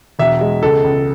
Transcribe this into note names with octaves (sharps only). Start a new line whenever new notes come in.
E1 E5
G#3
C#2 A4
C#2